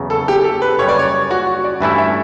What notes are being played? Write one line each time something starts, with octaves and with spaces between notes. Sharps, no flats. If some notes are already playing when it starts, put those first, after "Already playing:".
Already playing: E2 C#3 F#3 B3
A4
G4
A4
B4
F#2 C#3 G3 C#5
D5
C#5
F#4
F#4
D5
G2 E3 A3 C#4 E4 E5
E5